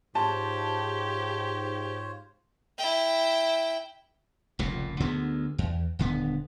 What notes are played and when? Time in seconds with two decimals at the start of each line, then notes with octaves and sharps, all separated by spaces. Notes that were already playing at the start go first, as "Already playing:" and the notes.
0.15 G#2 F4 G4 C5 C#5 A5
2.78 E4 G5
4.59 F1 C#2 A#2
5.00 D2 D3 G#3 B3
5.58 E2
5.99 D#1 D3 B3